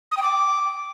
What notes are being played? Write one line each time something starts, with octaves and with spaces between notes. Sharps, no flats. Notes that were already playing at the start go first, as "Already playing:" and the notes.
D#6
G5
D6